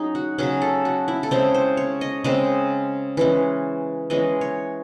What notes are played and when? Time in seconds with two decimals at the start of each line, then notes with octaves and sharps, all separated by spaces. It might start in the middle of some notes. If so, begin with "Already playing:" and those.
Already playing: F#3 C#4 D#4 G#4
0.15 F#4
0.38 C#3 F#3 C#4 G#4
0.62 A4
0.85 F#4
1.08 E4
1.23 A4
1.31 C#3 G#3 C4 C5
1.54 C5
1.77 C#5
2.01 D#5
2.24 C#3 G#3 C4 D#5
3.17 E3 G#3 C#4
4.10 E3 G#3 C#4 D#5
4.41 C#5